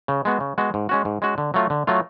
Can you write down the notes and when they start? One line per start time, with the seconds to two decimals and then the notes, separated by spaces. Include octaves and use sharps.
0.08 C#3
0.25 G#3 B3 F#4
0.40 C#3
0.58 G#3 B3 F#4
0.74 G#2
0.89 G#3 C#4 F#4
1.05 G#2
1.22 G#3 C#4 F#4
1.38 D3
1.54 F#3 A3 F4
1.70 D3
1.87 F#3 A3 F4